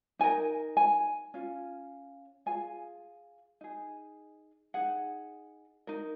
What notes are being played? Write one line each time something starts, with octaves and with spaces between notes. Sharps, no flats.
D#4 A#4 G#5
G#5
C#4 F4
F4 G#4 G#5
D#4 G#4
D#4 G#4 F#5
D#4 A#4